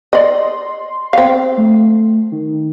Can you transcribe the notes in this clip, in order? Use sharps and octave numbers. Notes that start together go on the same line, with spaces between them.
D5 D#5 C6
C4 F5
A3
D#3